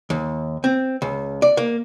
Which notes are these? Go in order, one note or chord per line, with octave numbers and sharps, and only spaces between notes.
D#2
C4
C#2
D5
A#3